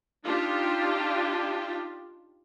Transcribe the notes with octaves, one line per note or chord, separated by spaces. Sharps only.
D4 D#4 F4 G4